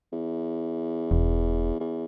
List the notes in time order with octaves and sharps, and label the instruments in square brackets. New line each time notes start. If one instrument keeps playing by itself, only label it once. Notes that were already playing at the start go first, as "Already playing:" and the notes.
[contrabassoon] E2
[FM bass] E1
[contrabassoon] E2